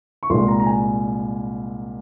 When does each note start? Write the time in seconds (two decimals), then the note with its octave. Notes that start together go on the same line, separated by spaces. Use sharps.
0.23 C#6
0.30 C2 A#2 G#3 C6
0.48 A#5
0.60 A#5
0.66 G#5